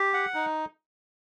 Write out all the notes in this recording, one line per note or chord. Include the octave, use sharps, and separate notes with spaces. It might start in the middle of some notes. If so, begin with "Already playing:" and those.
Already playing: G4
F#5
D#4